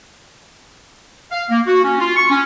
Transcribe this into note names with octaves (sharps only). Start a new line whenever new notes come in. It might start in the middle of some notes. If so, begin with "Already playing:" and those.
F5
A#3
F#4
C#4
F4
C#6
C#4